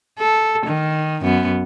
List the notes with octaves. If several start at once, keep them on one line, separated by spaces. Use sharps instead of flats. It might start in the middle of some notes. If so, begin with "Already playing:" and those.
A4
D#3
F#2 B3